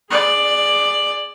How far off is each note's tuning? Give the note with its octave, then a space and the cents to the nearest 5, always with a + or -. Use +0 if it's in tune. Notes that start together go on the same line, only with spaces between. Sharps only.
G#4 -5 D5 +10